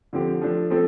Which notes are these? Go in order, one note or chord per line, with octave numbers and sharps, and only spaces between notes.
D3 F3 C4 G4
F3 A3 D4
F3 A3 C4 A4